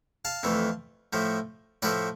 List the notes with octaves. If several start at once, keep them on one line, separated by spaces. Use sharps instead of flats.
F5 A5
F2 E3 A3
A2 F3 A3
A2 F3 A3 B4 D5